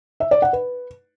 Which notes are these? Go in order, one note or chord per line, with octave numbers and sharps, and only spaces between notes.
E5
D5
F#5
B4